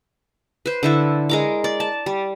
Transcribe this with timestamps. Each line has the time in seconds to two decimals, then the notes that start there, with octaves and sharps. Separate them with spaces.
0.66 B4 C5
0.83 D3 E4 A4
1.29 G#3 A#4 D6
1.64 D5
1.80 A5
2.06 G3